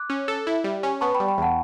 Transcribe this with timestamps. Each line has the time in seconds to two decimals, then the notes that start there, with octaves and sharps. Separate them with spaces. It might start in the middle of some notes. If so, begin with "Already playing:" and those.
Already playing: D6 F#6
0.10 C#4
0.28 A4
0.47 E4
0.64 G3
0.83 C#4
1.01 B3 A5 C#6
1.14 G5 B5
1.20 G3
1.28 G5 B5
1.38 E2 F#5 A5